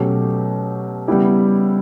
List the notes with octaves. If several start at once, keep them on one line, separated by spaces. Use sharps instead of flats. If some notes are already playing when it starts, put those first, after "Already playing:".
Already playing: B2 F#3 A3 C#4 G4
C#3 G3 B3 E4 G4